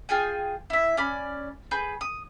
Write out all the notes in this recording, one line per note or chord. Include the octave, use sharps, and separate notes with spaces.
F4 G#4 G5 G#5
E4 E5
C#4 D5 B5
G#4 B4 G6
D#6